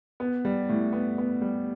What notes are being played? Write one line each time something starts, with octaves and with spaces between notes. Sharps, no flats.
B3
G3
A2
B3
B3
G3